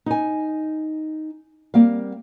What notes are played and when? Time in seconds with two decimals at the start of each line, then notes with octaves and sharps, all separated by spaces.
0.06 D#4 G#5
1.74 G3 A#3 C4 F5